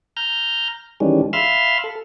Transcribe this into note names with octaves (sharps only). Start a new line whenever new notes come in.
A#5 F6 G6
D#3 E3 G3 G#3 C#4 D4
E5 F5 B5 C6 E6 F6
A4